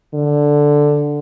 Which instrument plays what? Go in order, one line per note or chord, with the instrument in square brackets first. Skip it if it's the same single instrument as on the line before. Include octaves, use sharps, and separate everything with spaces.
[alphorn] D3